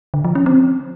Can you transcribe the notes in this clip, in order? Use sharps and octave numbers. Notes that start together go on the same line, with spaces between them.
D3
F3
C#4
C4